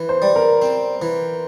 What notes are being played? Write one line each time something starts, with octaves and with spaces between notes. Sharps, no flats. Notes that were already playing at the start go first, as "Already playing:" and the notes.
Already playing: E3
C5
G3
A#4
C4
E3